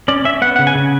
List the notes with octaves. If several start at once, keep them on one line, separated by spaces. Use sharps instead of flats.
C#4 D5
C#4 E5
B3 F#5
C#3 F#5
G#5
C#3